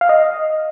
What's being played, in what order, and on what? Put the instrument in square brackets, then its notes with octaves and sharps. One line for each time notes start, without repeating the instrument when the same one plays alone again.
[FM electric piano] F5
D#5